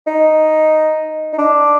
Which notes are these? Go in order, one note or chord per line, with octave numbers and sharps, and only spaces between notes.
D#4
D#4
D4